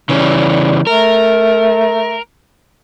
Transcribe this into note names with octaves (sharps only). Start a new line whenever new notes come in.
C#3 E3 G3 C#4
A3 A#4